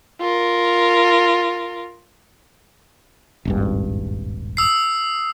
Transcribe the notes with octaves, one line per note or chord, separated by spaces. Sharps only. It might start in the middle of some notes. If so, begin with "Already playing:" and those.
F4 A#4
D#1 G#1 G2
D#6 E6 C7